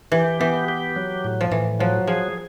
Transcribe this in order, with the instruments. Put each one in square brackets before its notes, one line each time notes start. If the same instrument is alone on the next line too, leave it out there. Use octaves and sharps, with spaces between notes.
[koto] E3 [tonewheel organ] G4
[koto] E3 [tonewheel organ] B3
[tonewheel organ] G4
F#3
A2
[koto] F3
[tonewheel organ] A2 [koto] E3
[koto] F3 [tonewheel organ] F#3
[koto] F3 [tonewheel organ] G#4